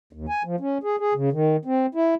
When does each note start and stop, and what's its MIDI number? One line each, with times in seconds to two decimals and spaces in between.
0.13 0.26 39
0.29 0.43 80
0.44 0.56 53
0.60 0.78 61
0.84 0.96 68
0.99 1.14 68
1.14 1.30 49
1.32 1.57 51
1.65 1.86 60
1.95 2.15 64